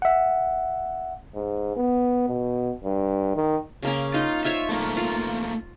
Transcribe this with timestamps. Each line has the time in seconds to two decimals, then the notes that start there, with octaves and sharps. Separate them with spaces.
0.02 E5 F#5
1.35 G#2
1.76 B3
2.28 B2
2.84 G2
3.36 D#3
3.83 C#3 A#3 C#4
4.14 D#4 F4
4.45 F4 C5 C#5 E5
4.69 A3 A#3
4.97 F4